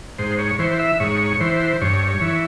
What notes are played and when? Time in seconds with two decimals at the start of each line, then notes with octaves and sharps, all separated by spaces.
0.19 G#2 C5
0.39 C#5
0.59 E3 C5
0.79 E5
1.00 G#2 C#5
1.40 E3 C5
1.81 G2 C#5
2.08 C#5
2.21 E3